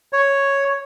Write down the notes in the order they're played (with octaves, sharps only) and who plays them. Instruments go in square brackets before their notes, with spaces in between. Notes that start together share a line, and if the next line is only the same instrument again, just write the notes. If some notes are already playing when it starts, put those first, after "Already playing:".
[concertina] C#5